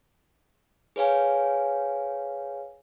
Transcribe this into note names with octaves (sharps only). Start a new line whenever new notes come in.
G#4 B4 C#5 F5 G#5